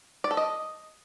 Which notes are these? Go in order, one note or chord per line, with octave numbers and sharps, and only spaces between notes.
D5
A4
D#5